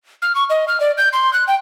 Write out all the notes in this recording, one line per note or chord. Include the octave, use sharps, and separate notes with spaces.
F6
C#6
D#5
F6
D5
G6
C6
F#6
G5